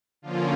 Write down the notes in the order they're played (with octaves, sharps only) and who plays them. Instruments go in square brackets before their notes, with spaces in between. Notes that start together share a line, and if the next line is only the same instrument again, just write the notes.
[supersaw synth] D3 F3 A#3 C#4 F4